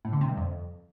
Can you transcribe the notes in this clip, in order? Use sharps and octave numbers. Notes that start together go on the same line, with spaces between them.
A2
D3
C3
G2
F2